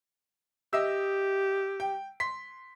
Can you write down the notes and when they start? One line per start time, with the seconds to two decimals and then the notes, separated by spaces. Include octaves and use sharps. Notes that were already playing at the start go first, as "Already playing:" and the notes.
0.73 G4 D#5 E5 E6
1.80 G5
2.20 C6 B6